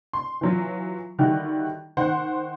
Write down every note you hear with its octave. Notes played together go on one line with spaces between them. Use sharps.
C6
E3 F#3 F4
D3 D#3 G3 E4 F#4
D#3 C5 F#5